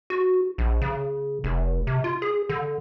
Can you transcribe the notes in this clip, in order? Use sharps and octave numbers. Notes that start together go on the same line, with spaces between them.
F#4
A#1
C#3
F1
C3
F4
G#4
D3